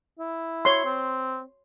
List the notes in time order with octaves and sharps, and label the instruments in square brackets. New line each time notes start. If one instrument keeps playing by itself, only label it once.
[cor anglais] E4
[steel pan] C#5 C6
[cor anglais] C4